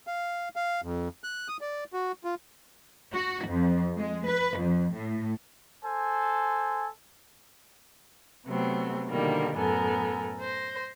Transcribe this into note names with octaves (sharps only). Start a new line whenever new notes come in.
F5
F5
F2
F#6
D#6
D5
F#4
F4
F#4
F2
G#3
B4
F2
A2
A4 C5 G#5
C3 F#3 A3 B3 C4
B2 D3 D#3 F3 G3 A#3
F#2 A2 B3 A4 A#4 G#5
C5 A#6